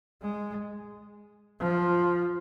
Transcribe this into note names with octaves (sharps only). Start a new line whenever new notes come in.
G#3
F3